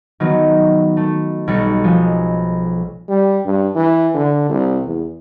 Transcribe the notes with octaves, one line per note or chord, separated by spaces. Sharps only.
D#3 F#3 B3
A3
B1 G3 C#7
F3 G#3
G3
G2
E3
D3
C2
E2